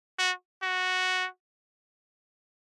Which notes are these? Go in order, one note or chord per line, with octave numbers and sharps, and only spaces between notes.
F#4
F#4